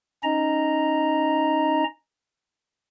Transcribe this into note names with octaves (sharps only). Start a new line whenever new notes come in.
C#4 D#4 D#5 A#5